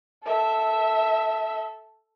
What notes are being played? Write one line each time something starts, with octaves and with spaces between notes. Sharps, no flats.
A4 E5